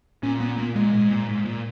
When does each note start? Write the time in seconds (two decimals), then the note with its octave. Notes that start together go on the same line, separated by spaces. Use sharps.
0.23 A#2 C#4
0.40 B3
0.58 A#3
0.76 A#2 G#3
0.93 G#2
1.10 A#2
1.29 G#2
1.45 A#2